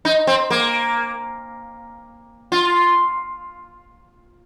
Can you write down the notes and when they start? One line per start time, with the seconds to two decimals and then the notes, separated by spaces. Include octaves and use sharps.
0.05 D#4
0.27 C4
0.50 A#3
2.52 F4